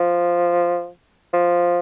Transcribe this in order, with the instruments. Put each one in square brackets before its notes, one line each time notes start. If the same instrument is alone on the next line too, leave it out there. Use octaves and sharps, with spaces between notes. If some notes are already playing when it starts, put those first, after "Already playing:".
Already playing: [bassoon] F3
F3